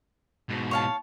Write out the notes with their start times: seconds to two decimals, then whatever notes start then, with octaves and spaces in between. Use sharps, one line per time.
0.49 G#2 B2
0.71 C#5 F5 A5